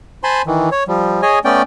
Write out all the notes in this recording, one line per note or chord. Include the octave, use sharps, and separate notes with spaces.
C5 G#5 A5 B5 C6
D#3 E3
C#5
F3 G3
G#4 C#5 D#5 G#5
A3 B3 C#4 D5 G5